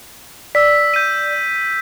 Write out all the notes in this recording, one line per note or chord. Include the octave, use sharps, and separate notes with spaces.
D5 E6 B6
G6 D#7